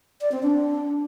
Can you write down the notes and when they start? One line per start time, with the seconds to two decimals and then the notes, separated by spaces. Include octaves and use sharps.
0.21 D5
0.32 C4
0.43 D4